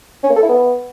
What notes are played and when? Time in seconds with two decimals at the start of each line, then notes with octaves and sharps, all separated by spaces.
0.23 C#4
0.30 A#3
0.36 A4
0.43 E4
0.49 B3